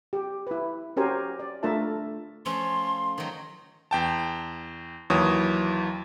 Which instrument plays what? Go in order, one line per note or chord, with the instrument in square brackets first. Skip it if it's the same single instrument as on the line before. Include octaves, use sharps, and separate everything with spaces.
[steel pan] G4
E4 B4
C#4 F#4 G4 A#4 C5 G#5
D5
A3 D4 F4 A#4 E5 A5
[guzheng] F3 A3 C#4 [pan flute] C6
[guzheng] D#3 F#3
[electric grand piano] E2 G5 A5
D#2 E3 F#3 C#5 D#6